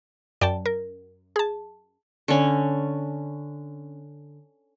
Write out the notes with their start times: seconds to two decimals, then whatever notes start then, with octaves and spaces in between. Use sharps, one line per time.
0.41 F#2 D5 G5 A5
0.66 A#4
1.36 G#4 A5
2.28 D3 C#4